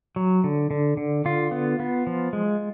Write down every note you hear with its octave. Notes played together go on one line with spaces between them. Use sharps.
F#3
D3
D3
D3
D3 F4
B3
B3
F3
G#3